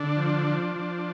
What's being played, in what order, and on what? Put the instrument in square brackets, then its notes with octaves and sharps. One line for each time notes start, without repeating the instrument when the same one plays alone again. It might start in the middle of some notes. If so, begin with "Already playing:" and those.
Already playing: [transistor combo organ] D3 D4
F3
F3
F3